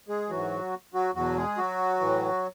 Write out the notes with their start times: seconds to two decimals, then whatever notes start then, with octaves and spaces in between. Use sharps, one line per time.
0.08 G#3 G#4
0.30 G#2 E3 F#3 F#4
0.93 F#3 F#4
1.14 E2 B2 F#3 F#4
1.37 G#3 G#4
1.57 F#3 F#4
2.00 A2 E3